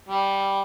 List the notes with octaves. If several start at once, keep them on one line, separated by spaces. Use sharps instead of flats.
G3